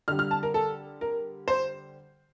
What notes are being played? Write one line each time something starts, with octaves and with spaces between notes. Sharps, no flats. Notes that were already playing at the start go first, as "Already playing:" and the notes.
D3 G3 F6
F6
A5
A#4
A4
A#4
C5